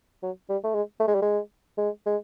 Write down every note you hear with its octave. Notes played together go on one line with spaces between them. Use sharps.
F#3
G3
A3
G#3
A3
G#3
G3
G#3
G#3
G#3